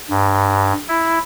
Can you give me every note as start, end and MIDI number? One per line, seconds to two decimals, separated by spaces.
0.10 0.73 43
0.88 1.19 64